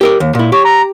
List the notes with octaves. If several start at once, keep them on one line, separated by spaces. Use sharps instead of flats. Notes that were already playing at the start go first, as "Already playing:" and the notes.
G4 A#4 D5
D#2
A#2 E4
G4 C#5
A#5